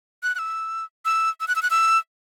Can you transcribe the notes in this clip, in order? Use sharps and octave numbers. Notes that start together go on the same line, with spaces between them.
F#6
F#6
E6
E6
E6
F#6
E6
F#6
E6